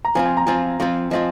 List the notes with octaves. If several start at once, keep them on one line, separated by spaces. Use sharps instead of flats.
A#5
F3 C4 F4 G#5
G#5
A#5
F3 C4 F4 G#5
F3 C4 F4
F3 C4 F4 D#5